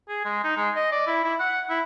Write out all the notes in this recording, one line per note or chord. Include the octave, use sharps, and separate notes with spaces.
G#4
G#3
D#4
G#3
D#5
D5
E4
E4
F#5
E4